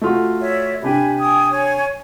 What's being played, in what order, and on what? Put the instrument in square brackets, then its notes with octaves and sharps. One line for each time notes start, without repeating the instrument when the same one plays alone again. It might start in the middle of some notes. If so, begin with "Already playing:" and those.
[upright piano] A3 F4 F#4
[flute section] C#5 D5 E5
[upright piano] C3 D4 G4 [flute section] G#5 B5
[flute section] G5 G#5 D#6
C#5 G#5